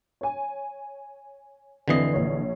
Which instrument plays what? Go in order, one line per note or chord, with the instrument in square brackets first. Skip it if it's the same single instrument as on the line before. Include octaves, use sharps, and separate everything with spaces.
[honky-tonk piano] C#5 G#5
[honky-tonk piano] F1 C4 C7 [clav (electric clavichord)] D3 E3 D#5
[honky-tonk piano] A#1 C#5